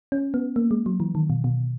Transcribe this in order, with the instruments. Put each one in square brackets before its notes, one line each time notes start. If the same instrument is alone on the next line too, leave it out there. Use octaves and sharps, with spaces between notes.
[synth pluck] C#4
B3
A#3
G#3
F#3
E3
D#3
B2
B2